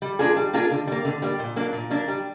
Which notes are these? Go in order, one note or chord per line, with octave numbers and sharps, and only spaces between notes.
G3
A#3 D4 F4 G#4
G3
A#3 D4 F4 G#4
D3
G3 A#3
D3
G3 A#3
A#2
F#3 A#3 D4
A#2
F#3 A#3 D4
G3